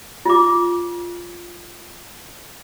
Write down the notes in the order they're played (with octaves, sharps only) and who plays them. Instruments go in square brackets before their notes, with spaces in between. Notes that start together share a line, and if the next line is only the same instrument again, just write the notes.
[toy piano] F4 D6